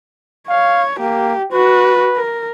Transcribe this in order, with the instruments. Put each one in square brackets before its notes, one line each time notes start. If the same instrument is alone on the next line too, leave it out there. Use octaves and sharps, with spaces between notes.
[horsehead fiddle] C#5 [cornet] F5
[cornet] A#3 [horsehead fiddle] G4
[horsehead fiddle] F#4 [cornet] B4
[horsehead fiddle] A#4